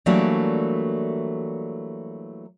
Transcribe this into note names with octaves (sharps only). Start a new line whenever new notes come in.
E3 F#3 G3 A3 A#3 D4